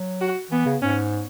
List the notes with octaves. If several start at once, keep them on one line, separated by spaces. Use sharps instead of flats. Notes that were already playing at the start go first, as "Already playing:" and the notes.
Already playing: F#3
F#4
E3 B3
C#3
G#2 C#4